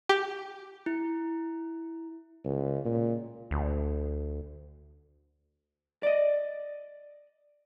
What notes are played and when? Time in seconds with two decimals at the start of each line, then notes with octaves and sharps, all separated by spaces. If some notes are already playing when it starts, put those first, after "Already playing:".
0.09 G4
0.86 E4
2.45 C#2
2.85 A#2
3.51 D2
6.03 D5 D#5